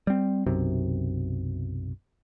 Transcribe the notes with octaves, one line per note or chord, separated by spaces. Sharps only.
G3 C4
B1 F#2 C3